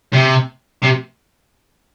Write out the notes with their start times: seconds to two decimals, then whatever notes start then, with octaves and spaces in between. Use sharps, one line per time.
0.13 C3
0.82 C3